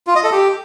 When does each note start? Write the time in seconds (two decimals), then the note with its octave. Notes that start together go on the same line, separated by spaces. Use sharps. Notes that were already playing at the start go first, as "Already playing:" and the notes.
0.07 F4
0.15 D#5
0.24 A4
0.32 G4